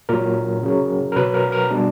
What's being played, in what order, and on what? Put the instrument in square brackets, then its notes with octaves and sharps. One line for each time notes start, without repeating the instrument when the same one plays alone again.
[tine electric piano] A#2 F#3 A#4
C#3 F#3
A#4
B2 F#3 B4
A#4
A#4
B2 G3 D4